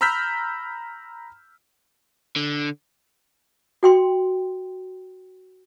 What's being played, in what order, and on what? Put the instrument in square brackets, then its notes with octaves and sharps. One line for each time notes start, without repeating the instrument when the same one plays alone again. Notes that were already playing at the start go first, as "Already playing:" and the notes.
[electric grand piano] A#5 B5 E6 F6 G6 B6
[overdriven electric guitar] D3
[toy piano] F#4 G5 C6